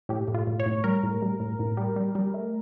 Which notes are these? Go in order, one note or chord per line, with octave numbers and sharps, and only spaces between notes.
A2 G4
A2
F4
A2
C#5
A2
G3 A#4
A2
G3
A2
A2
G3
G3
G3
A3